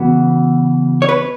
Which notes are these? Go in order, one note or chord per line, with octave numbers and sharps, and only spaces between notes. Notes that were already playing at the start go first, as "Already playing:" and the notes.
Already playing: C#3 E3 B3 F#4
C#5
B4